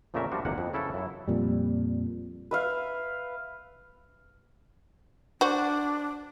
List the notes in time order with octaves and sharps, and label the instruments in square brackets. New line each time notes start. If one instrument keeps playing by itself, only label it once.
[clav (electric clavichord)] F2 A#2 C#3 A3 A#4 E5
F3 G3 D4 F#4
G1 E2 G#2 C3 A#3 F#5
F2
C#3 E4 A4 B4
F#2 E4
[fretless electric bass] F2 A#2 G3
[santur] B4 E5 F5
[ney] D4 [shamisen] F#4 C5